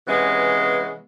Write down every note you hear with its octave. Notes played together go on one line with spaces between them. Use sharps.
C3 E3 G#3 B3 C#4